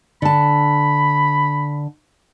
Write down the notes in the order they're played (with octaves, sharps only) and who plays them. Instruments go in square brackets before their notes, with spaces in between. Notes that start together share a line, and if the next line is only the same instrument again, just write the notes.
[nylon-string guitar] D3 A5 [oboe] B5